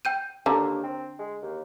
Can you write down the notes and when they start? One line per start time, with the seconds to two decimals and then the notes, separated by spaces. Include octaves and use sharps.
0.05 G5 G6 D#7
0.46 D#2 D3 A#5
0.83 C4
1.19 G#3
1.42 D#2